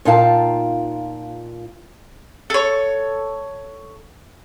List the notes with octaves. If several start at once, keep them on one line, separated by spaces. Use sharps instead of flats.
A#2 D#4 F4 F5 G5 A5
A4 C#5